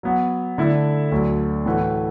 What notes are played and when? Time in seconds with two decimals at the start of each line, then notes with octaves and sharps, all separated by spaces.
0.03 F#3 B3 F#4
0.58 D3 A3 E4 A4 E5
1.12 D2 D3 F#3
1.65 A2 E3 A3 F#4 B4